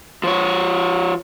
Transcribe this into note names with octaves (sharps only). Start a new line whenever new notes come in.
F3 C#5